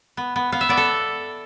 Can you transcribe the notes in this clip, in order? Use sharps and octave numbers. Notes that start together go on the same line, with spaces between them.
B3
B3
B3 F5
E5
B3 D5
A4